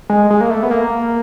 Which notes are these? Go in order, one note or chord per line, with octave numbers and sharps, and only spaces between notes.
G#3
G#3
A#3
A3
B3
A#3